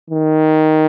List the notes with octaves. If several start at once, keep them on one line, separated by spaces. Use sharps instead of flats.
D#3